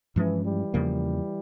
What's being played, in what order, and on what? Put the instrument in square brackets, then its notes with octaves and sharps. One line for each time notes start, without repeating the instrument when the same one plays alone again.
[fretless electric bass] G2 F3 G#3 C#4 [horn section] E3
[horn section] E3 G3
[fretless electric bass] E2 C#3 F3 A#3